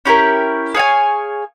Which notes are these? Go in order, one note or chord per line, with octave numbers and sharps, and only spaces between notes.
C#4 E4 G4 A#4
G#4 C#5 F5 G#5